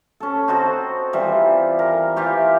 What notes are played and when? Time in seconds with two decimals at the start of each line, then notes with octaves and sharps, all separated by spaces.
0.20 C#4 A4
0.48 C4 D#4 F#4 A4
1.13 E3 G3 C4 F4
1.79 A#4
2.16 E3 F4 G4 C#6